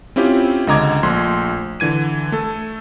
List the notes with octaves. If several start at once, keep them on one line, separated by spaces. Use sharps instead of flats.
C4 C#4 E4 F4 G4
C#2 D3 D#5 A#5 D6 G#6
A#1 A3 C6
D3 E3 G#6 D#7
A3 A4